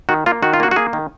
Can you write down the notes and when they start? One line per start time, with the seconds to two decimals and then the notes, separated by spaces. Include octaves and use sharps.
0.09 D#3 F#4
0.26 A#3 F4
0.42 D#3 F#4
0.53 F4
0.60 A#3 F#4
0.71 F#4
0.76 A#3 G#4
0.93 D#3